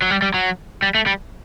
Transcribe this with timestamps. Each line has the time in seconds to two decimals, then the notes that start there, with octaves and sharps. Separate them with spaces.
0.02 F#3
0.11 G3
0.22 G3
0.34 F#3
0.83 G3
0.95 A3
1.07 G3